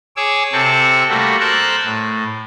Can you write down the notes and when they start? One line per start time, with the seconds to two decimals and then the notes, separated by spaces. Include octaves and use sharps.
0.16 G#4 C#5 D6 E6
0.53 C3 C4 A4 C#6
1.09 G3 A3 A#3 F#4
1.40 A4 A#4 C5 E6 F#6
1.84 A2